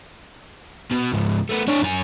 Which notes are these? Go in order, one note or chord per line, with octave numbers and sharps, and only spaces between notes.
B2
C#2 G#2
A3 B3
D4 C#5
F#2 G#5